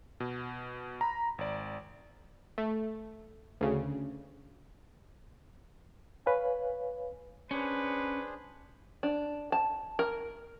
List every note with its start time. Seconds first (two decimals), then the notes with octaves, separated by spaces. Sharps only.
0.20 B2
1.01 A#5 B5
1.38 G#1 D5
2.58 A3
3.61 D2 C#3
6.26 B4 C#5 F5 G#5
7.51 C#4 D4 G#4 B4 C5
9.03 D4
9.52 A5
9.99 A#4